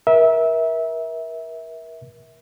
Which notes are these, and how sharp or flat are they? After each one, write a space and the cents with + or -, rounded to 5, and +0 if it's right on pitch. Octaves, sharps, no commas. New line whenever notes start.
A#4 +35 E5 -20